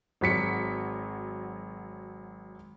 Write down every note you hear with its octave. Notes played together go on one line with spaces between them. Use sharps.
G#1 F#3 B6 C#7